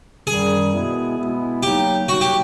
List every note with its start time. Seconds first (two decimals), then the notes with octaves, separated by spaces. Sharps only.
0.26 F#2 D#3 G3 G#4
0.72 B2 G#3 B3 E4
1.17 B2 G#3 B3 E4
1.63 F#3 A#3 D#4 G4
2.08 F#3 A#3 D#4 F#4
2.21 G4